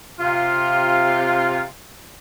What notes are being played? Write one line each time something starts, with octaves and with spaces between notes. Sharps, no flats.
C3 F4